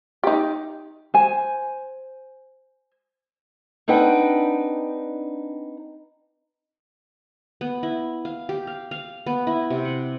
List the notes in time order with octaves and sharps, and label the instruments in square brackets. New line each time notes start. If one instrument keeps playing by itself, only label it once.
[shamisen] D#4 G4
[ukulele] C5 G#5
[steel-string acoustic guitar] C4 D4 D#4 B4 F#5 G5
[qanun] B3
E4
F5
G4
F5
F5
B3
E4
C3
F#5